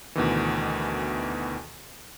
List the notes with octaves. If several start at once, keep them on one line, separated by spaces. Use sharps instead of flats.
D2 B2 D#3 E3